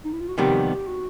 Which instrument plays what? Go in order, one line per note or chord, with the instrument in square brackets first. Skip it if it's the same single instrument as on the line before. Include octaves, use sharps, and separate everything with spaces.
[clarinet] D#4
E4
F4
F#4
[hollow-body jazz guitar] F2 C3 D#3 G3 B3 [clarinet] G4
[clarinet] F#4